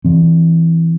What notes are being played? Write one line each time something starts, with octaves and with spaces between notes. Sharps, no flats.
E3 C4